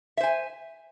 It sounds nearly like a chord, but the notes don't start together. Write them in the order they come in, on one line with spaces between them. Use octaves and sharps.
E5 C5 G#5